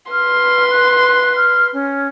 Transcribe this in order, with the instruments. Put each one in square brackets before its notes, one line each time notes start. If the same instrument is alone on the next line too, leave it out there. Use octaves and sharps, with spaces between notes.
[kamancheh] B4 C6 [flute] F6
[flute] F#6
F6
C#4